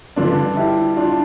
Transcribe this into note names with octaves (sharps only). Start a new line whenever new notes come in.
G2 D3 D4 F4
E4 G4
D4 F4